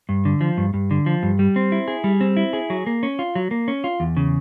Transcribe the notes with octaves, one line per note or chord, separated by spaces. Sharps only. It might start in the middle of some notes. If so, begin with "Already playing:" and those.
G2
D3
F3
G2
G2
D3
F3
G2
G3
C4
E4
G#4
G3
C4
E4
G#4
F#3
A#3
C#4
F4
F#3
A#3
C#4
F4
E2
C#3